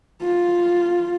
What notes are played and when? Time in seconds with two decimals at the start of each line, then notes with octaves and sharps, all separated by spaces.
0.22 F4